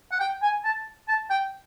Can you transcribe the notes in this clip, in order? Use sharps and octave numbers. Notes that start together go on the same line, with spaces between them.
F#5
G5
G#5
A5
A5
G5